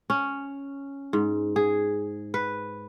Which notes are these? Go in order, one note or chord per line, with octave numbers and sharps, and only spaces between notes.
C#4
G#2
G#4
B4